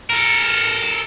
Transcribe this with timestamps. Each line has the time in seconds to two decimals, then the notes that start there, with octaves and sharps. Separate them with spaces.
0.10 A4 A#4